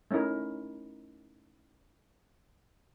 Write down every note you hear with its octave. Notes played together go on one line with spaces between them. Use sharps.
A3 C#4 D#4 E4 A#4